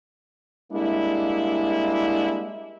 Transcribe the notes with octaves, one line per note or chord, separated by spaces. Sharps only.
G3 G#3 A#3 D4 E4